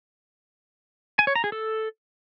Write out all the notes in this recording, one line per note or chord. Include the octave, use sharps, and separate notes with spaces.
G#5
C#5
A#5
G#4
A4